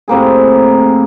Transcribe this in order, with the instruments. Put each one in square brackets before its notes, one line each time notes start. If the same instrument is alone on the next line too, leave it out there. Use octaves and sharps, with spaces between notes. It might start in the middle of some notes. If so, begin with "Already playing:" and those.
[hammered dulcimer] A2 C3 A#3 G#4